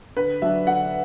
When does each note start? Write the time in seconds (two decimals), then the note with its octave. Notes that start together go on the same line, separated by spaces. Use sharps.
0.17 D3 B4
0.42 F#3 D4 E5
0.67 D3 F#5